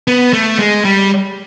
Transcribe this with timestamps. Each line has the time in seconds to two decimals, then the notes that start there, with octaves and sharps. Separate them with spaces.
0.08 B3
0.33 A3
0.59 G#3
0.85 G3